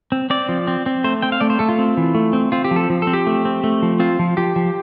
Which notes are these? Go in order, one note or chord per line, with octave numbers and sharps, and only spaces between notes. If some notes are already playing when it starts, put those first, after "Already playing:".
C4
C4 D5
F3
C4
C4
A3 C5
C4 G5
F5
A3 D5
C5
A3 A4
F4
C4
E3
A3
C4
C4 F4
G4
F3
A4
F3
C4 A4
G4
A3
C4
A3
F3
C4 F4
F3
F3 G4
F3